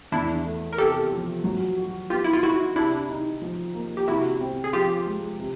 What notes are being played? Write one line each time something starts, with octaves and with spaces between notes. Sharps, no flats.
E2 D4 E4
A3
A#4
C3 G4 A4
F3
F#3
F#4
B3 F4 G4
E4
F4
D#4 E4 F#4
C3 D4 E4
D#4
F3
A#3
G4
C3 E4 F#4
C4
G#4
F3 F4 G4
G#3
C3